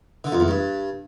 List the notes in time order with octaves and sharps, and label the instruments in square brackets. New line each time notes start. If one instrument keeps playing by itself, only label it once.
[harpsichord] D3
F2
E2
G2